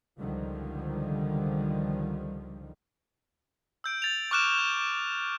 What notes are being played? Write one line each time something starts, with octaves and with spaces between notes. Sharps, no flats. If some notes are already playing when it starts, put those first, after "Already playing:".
C#2 D3 D#3 F3 G3
E6 G6 D7
A6 F7
C#6 D6 F6 F#6 D7 E7
G6